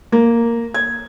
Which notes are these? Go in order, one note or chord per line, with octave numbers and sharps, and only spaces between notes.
A#3
G#6